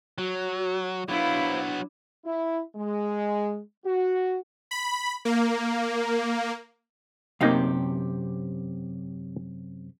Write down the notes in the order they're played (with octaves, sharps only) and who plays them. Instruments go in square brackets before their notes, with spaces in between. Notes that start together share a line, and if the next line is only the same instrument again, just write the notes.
[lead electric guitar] F#3 [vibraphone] F#4
[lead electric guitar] F#3 B3 [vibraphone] D4 [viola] E4 [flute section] C5 F5
[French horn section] E4
G#3
F#4
[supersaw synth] B5
A#3
[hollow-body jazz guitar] F#2 C3 G4 [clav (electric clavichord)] A#3 D#4 F5